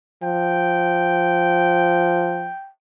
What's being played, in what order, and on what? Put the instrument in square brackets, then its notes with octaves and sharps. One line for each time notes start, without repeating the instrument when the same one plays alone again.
[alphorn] F3 [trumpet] G5